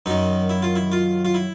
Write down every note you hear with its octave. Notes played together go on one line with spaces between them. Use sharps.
F#2 D#3 D#4
E4
F4
E4
F4
F4
E4